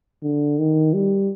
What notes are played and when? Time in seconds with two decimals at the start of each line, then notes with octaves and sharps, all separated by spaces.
0.23 D3
0.59 D#3
0.94 G3